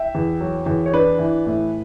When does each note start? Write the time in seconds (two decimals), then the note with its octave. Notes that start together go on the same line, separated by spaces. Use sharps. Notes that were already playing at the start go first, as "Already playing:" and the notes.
Already playing: E5 G5
0.15 E2
0.41 F#3
0.66 E2
0.86 C#5
0.94 D4 B4
1.19 E3
1.46 A2